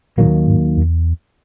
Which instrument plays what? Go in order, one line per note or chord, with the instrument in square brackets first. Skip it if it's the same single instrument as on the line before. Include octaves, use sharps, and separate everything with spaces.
[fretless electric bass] D#2 D#3 F#3 A#3 [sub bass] A#2
[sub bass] G#2
E2